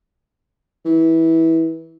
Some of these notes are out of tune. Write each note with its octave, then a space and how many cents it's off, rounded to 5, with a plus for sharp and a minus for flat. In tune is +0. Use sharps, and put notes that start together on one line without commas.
E3 -20